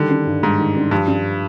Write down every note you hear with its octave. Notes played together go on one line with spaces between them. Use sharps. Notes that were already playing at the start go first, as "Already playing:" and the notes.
Already playing: D3 D#3 G3
D4
G2
G#2 G3
D#3
D4
G2 F3
D4